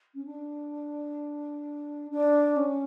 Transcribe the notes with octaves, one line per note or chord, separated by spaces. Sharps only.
C#4
D4
D4
C#4